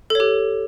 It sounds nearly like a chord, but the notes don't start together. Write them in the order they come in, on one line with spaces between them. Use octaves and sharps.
A4 C#5 G4